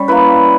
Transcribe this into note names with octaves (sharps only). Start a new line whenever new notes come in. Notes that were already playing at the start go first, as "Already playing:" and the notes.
Already playing: G3 C#4
A#3 E4 B4